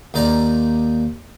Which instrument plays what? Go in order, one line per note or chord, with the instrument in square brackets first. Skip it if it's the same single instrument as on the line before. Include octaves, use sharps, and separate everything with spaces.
[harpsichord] D#2 D#4 D5 A#5